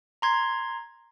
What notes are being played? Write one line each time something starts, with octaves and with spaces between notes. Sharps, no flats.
A#5 C6 G#6